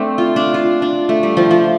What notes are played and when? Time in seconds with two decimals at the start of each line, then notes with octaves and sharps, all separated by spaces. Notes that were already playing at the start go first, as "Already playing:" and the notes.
Already playing: A3 C4 D4
0.18 F4
0.36 D4
0.54 F4
0.82 D4
1.09 A3
1.23 G3
1.37 F3
1.51 F3